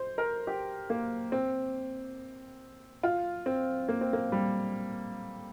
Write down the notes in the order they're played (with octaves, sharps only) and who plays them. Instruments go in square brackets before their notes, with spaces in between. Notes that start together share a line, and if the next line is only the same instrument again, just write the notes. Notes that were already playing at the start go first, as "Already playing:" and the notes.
Already playing: [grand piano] C5
A#4
G4
A#3
C4
F4
C4
A#3
C4
A#3
G3